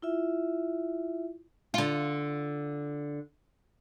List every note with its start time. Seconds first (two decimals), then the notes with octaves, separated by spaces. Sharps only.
0.02 E4 F4 E5
1.74 D3 F4